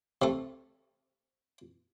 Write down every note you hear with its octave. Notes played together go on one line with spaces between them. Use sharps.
C3 A3